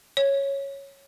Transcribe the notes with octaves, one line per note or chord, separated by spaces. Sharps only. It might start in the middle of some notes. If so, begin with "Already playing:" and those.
C#5